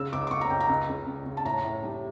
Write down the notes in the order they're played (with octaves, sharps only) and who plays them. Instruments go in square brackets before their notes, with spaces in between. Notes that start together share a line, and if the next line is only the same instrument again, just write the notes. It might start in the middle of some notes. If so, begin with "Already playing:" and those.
Already playing: [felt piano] C#3 E6
C#2 D6
D6
C#2 C#6
A#5
C#2 G5
A#5
C#2
C#2
C#3
C#3
A5
A2 A#5
A2
G3